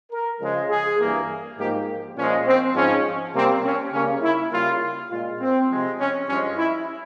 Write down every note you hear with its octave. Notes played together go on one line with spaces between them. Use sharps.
A#4
C#3 F3 G#3
G#4
G2 E3 A#3
G#2 F3 A#3 G4
A#2 F3 G#3 C#4
C4
G#2 F3 G#3 C#4
C3 G3 A#3 C4
C#4
C#3 G3 A#3 C#4
E4
C#3 G3 A#3 F4
A#2 G#3 F4
C4
C3 F3 G#3
C#4
G2 F3 G#3 C#4
E4